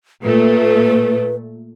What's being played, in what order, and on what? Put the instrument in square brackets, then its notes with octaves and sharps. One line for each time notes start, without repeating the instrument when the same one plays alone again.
[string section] A#2 A3 [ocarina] B4